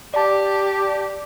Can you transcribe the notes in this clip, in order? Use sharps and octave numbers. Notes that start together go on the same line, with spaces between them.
G4 D5 A5